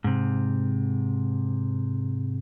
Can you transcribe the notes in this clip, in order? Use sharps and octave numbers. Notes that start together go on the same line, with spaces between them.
G#2 C3